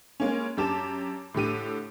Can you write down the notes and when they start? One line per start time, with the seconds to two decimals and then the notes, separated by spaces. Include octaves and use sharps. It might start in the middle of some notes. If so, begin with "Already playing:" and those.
0.20 G#3 A#3 C#4
0.57 F#2 D4 G4 A5 D6 E7
1.34 A2 D3 G4 D#7